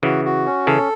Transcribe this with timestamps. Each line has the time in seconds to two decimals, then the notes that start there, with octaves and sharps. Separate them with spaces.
0.03 C#3 E3 F#4
0.25 F#4
0.46 C#4
0.66 C#3 E3 A4